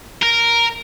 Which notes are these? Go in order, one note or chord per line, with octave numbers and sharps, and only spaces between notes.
A#4